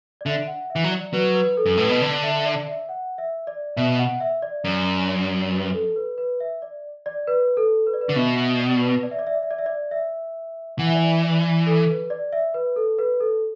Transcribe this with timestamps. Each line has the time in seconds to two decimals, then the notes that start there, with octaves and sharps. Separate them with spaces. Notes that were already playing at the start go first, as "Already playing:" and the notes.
0.21 D5
0.26 D3 E5
0.47 F#5
0.70 E5
0.76 E3
0.84 F#3
0.91 D5
1.13 F#3 B4
1.35 B4
1.57 A4
1.66 F#2
1.77 A2 B4
1.89 B2
2.01 D3 D5
2.23 E5
2.40 E5
2.45 D5
2.67 E5
2.89 F#5
3.18 E5
3.47 D5
3.77 B2 E5
3.99 F#5
4.20 E5
4.42 D5
4.64 F#2
5.52 B4
5.74 A4
5.96 B4
6.18 B4
6.40 E5
6.62 D5
7.06 D5
7.27 B4
7.57 A4
7.87 B4
7.94 D5
8.01 B4
8.09 D3
8.16 B2 E5
8.38 E5
8.60 D5
8.81 B4
9.03 D5
9.11 E5
9.19 D5
9.27 E5
9.35 D5
9.43 E5
9.51 D5
9.58 E5
9.66 D5
9.91 E5
10.79 E3 F#5
10.86 E5
10.95 D5
11.02 E5
11.23 D5
11.66 A4
11.89 B4
12.10 D5
12.32 E5
12.54 B4
12.76 A4
12.98 B4
13.20 A4